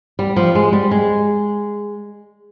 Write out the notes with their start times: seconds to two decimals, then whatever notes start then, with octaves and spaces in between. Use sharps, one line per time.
0.19 G3
0.36 F3
0.55 G#3
0.73 G3
0.91 G#3